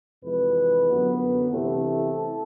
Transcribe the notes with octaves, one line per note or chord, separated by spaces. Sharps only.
F2 C3 E3 G#3 B4
F#2 D3 F#3 B3
C3 E3 A3 C4 A4